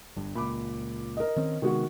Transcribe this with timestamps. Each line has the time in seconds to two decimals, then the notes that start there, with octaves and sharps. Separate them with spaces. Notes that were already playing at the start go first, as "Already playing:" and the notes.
0.16 G1 G2
0.35 C#2 A#2 B5 D6
1.17 A#4 D#5
1.36 D#3 C4 C#4
1.62 C3 D#3 G#3 B3 F#4 F#5